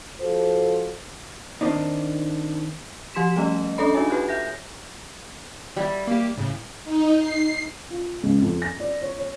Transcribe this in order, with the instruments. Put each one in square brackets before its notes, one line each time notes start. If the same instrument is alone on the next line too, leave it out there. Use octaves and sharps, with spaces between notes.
[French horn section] F3 F4 F#4 A4 C5
[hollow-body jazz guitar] D#3 C4 D4 D#4
[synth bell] F3 G4 C6 B6 E7
G3 A3 C#4 D#5
C#4 D4 A4 C#5 B5
D4 D#4 F#4 G#4 C#5 G#5
F4 G4 B4
E5 G6 A#6
[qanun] G3 E4
[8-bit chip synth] A#3 G4
A2 C#3
[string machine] D#4
C7
[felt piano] F4
C#2
F2
A#6
D5
C#5
C#5